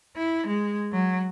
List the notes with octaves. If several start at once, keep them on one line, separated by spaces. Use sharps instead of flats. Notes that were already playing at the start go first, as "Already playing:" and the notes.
E4
G#3
F#3